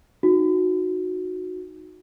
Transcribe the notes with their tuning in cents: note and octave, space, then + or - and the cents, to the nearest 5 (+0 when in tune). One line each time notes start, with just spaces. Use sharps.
D#4 +0 F#4 -15